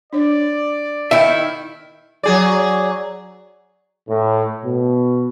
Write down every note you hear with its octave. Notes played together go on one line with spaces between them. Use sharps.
D4 C#5 D5
D#3 E4 E5 G5
F#3 G#4 D5
A2
B2